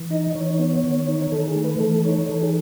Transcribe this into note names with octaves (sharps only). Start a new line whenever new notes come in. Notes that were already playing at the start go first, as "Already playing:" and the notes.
Already playing: E3
D#4 D#5
E3 C#5
B3
D#3
D#4
D#3 A4
G#4
A3
B4
E3 A4
D#4 C#5
E3 A4
G#4